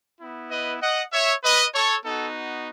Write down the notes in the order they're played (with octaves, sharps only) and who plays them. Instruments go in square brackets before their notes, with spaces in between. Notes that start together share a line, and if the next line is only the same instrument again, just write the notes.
[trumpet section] B3 E4
B4 D#5
D#5 F#5
C#5 E5
B4 D#5
A4 C#5
B3 D#4 F#4 A4